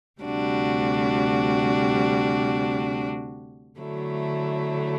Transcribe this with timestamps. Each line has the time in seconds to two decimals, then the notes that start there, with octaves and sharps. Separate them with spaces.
0.21 D2 C3 G3 D4 F#4
3.80 D3 F#3 A3 E4